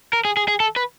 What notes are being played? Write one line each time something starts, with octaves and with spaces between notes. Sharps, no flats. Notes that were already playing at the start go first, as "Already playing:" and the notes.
A#4
G#4
G#4
G#4
A4
B4